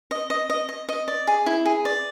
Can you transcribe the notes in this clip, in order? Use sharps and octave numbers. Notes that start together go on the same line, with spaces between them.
D#5
D#5
D#5
D#5
D#5
D5
G#4
E4
G#4
D5